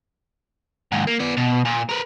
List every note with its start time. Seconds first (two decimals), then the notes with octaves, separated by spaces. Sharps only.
0.92 D#2 G#2
1.07 A#3
1.19 B3 D5
1.37 B2
1.65 A#2
1.89 A#4 B4